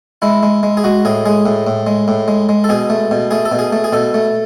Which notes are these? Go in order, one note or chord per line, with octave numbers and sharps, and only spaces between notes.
G#3 E4
G#3
G#3
G#4
G#3 F#4
A2 G#4
G#3 G#4
A2
A2
G#3
A2
G#3
G#3
A4
B2 G#4
A3
B2
A3 G#4
A4
B2
G#4
A3
G#4
B2 A4
A3